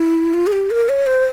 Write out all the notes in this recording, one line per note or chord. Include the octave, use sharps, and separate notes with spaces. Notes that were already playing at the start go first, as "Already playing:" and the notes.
Already playing: E4
F4
G#4
G4
A#4
C#5
C5